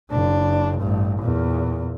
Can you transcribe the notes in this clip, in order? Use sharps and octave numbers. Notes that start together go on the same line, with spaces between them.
F#1 D4
A1 G2
E2 A#2